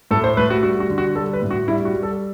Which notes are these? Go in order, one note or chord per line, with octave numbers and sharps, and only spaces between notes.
A2 A4
C5
A3 B4
F#4
G3 F#4
F#4
D3
F#4
G3 A4
B4
A2
F#4
G3 E4
F#4
G3
A4